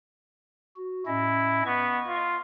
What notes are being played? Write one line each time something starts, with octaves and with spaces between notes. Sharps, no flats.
F#4
A2 C#4 E4 D#5
B3 D#5 C#6
F4